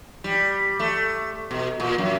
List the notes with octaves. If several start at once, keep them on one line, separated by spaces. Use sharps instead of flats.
G3
A3
B2
A#2
F#2